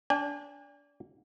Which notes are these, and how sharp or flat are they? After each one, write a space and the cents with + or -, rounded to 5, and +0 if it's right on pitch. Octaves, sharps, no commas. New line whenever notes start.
D4 -25 G#5 -40